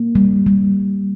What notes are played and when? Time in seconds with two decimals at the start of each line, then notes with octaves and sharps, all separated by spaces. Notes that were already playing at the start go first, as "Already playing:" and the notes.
Already playing: A#3
0.15 G3
0.46 G3